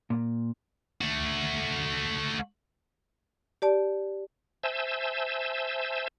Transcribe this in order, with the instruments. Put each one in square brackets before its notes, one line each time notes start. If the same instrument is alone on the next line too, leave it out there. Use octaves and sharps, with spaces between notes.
[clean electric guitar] A#2
[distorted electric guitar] A3 F#4
[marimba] G4 D5 A5
[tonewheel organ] C5 E5 G#5 A5 E6 G6